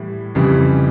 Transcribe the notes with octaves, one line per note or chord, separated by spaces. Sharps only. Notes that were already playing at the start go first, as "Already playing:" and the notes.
Already playing: A2 E3 G3 E4
F2 C#3 E3 G3